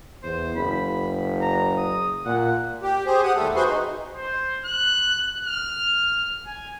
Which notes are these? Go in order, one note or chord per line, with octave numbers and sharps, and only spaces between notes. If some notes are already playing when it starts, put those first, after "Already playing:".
E2 C5
F#1 B5
A#5
D#6
A#2 F#5
G4
G4 G#4 C5
G4 F#5 D#6
D#2 G3 A3 A4
F#4 G#4 B4 C5 C6
D#4
C5
F#6
F6
G#5